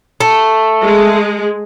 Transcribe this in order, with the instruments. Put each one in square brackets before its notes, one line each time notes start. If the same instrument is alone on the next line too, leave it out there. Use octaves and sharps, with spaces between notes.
[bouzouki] A3
[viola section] G#3